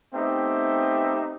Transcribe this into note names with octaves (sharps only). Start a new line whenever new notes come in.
A3 B3 C4 D#4 G4 E5